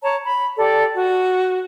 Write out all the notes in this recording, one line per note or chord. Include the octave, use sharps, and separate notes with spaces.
C#5 A5 A#5
B5
G4 A4 D5
F#4